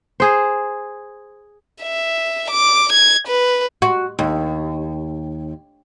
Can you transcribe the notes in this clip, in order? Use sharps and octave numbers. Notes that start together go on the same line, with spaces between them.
G#4 C5
E5
D6
G#6
B4
F#4
D#2